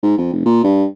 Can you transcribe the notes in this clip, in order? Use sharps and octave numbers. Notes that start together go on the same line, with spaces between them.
G#2
F2
F1
A#2
G2